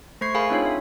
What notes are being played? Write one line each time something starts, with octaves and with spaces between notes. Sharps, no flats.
A3 C5 C#6 G#6 C7
G#4 A#4 F5 G#5 B5
C4 D4 D#4 F4 C#5
E5